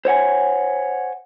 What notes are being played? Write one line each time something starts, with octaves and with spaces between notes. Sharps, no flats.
C5 C#5 F#5 G#5